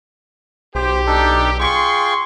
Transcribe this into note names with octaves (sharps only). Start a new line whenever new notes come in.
B1 G4 C5
D4 D#4 A4
F4 G#4 G5 C6 C#6